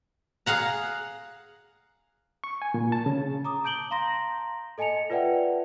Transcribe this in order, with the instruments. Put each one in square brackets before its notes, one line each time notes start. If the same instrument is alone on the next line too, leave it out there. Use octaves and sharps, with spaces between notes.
[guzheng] G#4 F5 F#5 A#5
[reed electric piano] C#6
G#5
A#2
A5
C#3
[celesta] A#5 D6 D#6
A5 G6 D7 F#7 G7
F5 A#5 C6 A#6
A4 D#5 G#5 A5 C#7 F7
F4 B4 D5 E5 F#5 G5